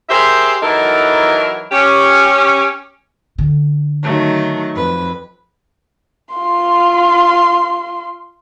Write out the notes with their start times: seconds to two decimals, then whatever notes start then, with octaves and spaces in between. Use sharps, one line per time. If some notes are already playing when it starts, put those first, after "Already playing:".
0.09 G4 G#4 A#4 C5 E5
0.63 E3 F#3 D#4 E4 A4 A#4
1.72 C#4 G4
3.38 D3
4.02 D#3 F#3 A3
4.74 F2 B4
6.34 F4 C6